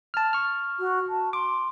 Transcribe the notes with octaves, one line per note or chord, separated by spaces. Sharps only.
A5 F6
C#6 F6
F#4
A5
C6 D6